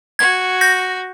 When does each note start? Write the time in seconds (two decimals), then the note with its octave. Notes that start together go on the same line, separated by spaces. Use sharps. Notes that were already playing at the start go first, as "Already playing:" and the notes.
0.19 F#4 G#6
0.61 G6 A#6